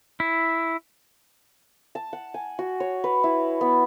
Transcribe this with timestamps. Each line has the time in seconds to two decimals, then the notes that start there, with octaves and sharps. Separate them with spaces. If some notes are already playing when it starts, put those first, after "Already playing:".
0.20 E4
1.95 A5
2.13 F#5
2.34 G#5
2.59 F#4
2.80 C#5
3.04 B4
3.24 E4
3.61 B3